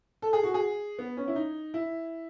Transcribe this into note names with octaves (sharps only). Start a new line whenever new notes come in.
A4
G#4
F#4
G#4
B3
C#4
E4
D#4
E4